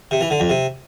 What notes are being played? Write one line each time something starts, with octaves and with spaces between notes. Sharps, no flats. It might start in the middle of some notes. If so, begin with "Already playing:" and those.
C3
E3
D3
F2
C3